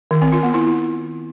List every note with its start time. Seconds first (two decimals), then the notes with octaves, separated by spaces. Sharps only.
0.11 D#3
0.22 C4
0.32 F4
0.43 B3
0.54 E4